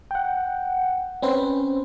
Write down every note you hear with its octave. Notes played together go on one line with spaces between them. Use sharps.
F#5 G5
C4 C#4 B4 C5